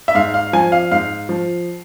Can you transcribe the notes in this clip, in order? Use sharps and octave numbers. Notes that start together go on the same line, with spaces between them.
E5
G#2 F5
F5
F3 G#5
F5
G#2 F5
F3